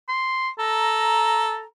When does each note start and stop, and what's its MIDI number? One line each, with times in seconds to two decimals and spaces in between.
0.09 0.49 84
0.59 1.63 69
0.59 1.63 82